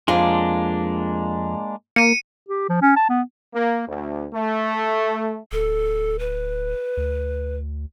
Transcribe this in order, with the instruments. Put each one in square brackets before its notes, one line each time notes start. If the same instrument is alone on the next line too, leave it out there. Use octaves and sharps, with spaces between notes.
[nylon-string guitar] F2 F4 [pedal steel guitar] G#3 A#3 D4
[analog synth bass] A#3 [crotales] C#7 D#7
[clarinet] G4
F3
C#4
A5
B3
[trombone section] A#3
D2
A3
[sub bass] D1 [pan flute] A4
[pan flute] B4
[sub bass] D2